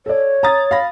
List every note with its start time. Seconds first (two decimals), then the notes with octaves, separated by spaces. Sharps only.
0.06 A4 C#5 D5
0.43 A#5 D#6 A6
0.71 F5 B5 A#6